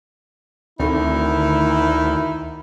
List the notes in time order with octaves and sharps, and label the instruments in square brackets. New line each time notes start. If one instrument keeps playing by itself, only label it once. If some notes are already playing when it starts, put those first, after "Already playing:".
[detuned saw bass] D2 [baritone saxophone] D#3 [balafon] C4 D#4 A4 [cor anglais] E4